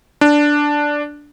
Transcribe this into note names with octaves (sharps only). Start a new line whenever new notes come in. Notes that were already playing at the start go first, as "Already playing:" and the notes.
D4